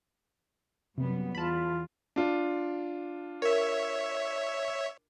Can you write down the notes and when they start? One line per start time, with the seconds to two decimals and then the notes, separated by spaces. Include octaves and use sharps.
0.98 F#2 C3 G3 B3
1.35 E2 F4 A5 B5
2.16 D4 F4
3.42 A#4 C#5 E5